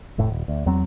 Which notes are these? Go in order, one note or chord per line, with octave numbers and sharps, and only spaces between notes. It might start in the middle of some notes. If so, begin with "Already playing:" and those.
F1 A2 A3
D#1
D2
E2 F#3 C4